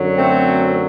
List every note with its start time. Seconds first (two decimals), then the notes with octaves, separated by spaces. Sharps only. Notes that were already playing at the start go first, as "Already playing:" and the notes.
Already playing: F#2 D3 F#3
0.16 A3 C4